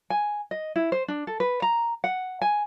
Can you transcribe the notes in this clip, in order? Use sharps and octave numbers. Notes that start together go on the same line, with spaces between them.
G#5
D#5
E4
C5
D4
A4
B4
A#5
F#5
G#5